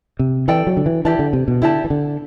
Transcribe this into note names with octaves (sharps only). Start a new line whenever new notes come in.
C3
E3 A4 D5 G5
F#3
D3
E3
E3 E4 G4 D5 A5
D3
C3
B2
D3 E4 G4 D5 A5
E3
D3